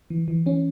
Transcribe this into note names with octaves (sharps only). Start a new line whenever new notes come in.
E3
E3
E3 C#4